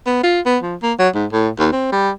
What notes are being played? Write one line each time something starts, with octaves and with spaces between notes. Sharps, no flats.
B3
F4
B3
F3
A#3
F#3
G#2
A2
D#2
C4
G3